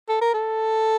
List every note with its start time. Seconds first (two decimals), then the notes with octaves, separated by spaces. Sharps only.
0.09 A4
0.21 A#4
0.34 A4